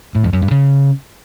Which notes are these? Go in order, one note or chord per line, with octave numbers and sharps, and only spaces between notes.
A2
F2
F#2
G2
C#3